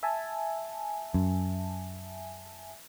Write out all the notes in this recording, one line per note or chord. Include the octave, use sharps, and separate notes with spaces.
E5 G#5 A5
F#2